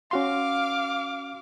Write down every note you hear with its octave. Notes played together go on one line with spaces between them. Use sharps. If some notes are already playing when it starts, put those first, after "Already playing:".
C#4 F#4 F5 C6 D6